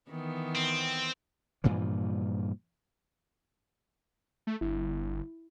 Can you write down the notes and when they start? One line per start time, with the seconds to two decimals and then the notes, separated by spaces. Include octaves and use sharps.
0.10 D#3 E3 B3
0.55 C4
1.64 G2 A#2 E3 F3
4.47 A3
4.61 G1 E4